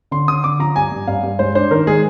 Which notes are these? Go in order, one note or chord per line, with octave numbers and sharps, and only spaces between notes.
D3 C6
D3 D#6
D3 D6
F3 A#5
G2 G#5
G2
G2 F5
G2
G#3 C5
D4 C5
D#3 A#4
G#3 G#4